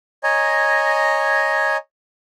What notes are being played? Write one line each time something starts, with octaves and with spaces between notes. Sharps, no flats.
C#5 D#5 G#5 A#5